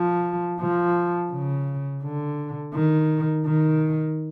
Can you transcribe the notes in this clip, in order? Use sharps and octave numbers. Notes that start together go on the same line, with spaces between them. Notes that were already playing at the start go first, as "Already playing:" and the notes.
Already playing: F3
F3
C#3
D3
D#3
D#3